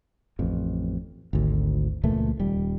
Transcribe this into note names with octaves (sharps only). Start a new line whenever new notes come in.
A1 F2
G#1 D2
C#2 A#2 E3 A3
D#1 G3